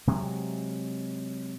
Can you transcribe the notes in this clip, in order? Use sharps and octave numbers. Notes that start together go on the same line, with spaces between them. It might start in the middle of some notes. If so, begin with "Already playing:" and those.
C3 F#3 G#3